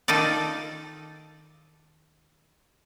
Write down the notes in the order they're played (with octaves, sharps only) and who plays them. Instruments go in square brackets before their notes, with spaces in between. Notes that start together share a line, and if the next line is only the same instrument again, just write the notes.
[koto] D#3 D#4 F4 A4 D5